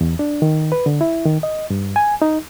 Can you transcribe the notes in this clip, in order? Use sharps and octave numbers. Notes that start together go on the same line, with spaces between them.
E2
D4
D#3
B4
D3
E4
D#3
D#5
G2
G#5
D#4